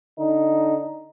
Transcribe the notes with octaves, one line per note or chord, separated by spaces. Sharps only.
D3 D#4